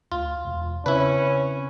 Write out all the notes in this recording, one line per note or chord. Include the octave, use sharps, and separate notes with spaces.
D2 F4
E1
C#3 C4 C#4 E4 B4